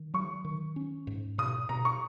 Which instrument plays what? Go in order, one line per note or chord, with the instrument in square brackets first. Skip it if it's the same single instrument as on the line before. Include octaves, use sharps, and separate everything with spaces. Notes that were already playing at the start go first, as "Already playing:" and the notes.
Already playing: [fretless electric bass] D#3
[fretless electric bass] F#3 [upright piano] C#6
[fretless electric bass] D#3
C#4
G#2
[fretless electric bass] B2 [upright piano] D#6
[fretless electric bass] B2 [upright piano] A#5
[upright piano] C#6